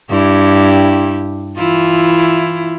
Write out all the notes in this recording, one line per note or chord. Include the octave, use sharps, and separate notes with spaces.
G2 E4 G4
E3 E4 F4